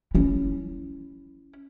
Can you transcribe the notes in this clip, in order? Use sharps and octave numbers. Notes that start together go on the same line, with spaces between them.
C#4 E4